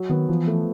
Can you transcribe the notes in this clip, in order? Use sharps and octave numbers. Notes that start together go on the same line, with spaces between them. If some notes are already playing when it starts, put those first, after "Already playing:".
Already playing: F#3
D#3 B3
E3 F3
A3